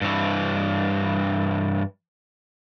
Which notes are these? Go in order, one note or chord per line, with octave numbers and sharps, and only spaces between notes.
G2 E3